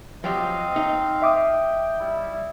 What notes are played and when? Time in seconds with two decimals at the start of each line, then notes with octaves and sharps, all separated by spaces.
0.24 F3 F#3 C4 G4 D#5 F5
0.76 D#4
1.22 E5 G5 D6 D#6
2.00 G3 E4